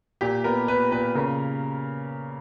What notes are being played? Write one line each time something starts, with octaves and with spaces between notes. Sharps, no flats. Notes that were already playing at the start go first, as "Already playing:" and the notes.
A#2 G4
B3 A#4
A#2 B4
A#2 B4
C#3 A#4